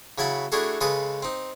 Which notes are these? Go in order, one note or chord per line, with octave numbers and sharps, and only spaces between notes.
C#3 F#3 E4 F#5 A5 B5
A3 D4 E4 F#4 G#4 A4
C#3 G#3 A4 B4 D#6
C4 D#4